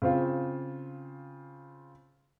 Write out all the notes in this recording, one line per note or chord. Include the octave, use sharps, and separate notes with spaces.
C#3 C4 F4